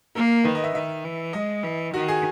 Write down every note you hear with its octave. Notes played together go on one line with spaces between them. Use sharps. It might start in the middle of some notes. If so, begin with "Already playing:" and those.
A#3 A#4
D#3 B4
D#5
E5
D#3 E5
E3
G#3 D#5
E3
D#3 F#4
G#4